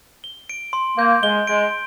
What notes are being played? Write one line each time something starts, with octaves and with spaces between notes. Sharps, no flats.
G7
D7
C6
A#3 G6
G#3 G7
G#3 D7